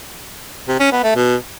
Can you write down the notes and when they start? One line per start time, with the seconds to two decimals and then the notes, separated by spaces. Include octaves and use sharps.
0.68 C3
0.80 C#4
0.92 B3
1.04 A3
1.15 B2